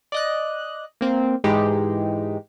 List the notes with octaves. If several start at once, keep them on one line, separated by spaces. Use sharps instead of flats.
D5 D#5 F#6
A#3 C4
G#2 E3 G#3 D#4 G4